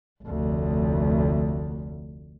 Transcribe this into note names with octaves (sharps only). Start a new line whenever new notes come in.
F1 D2